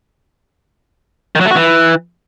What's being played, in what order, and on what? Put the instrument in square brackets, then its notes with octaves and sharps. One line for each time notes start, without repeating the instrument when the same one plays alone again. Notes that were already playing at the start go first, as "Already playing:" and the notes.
[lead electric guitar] D#3
F#3
A3
F#4
E3